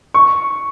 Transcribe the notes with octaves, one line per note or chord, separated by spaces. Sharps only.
C#6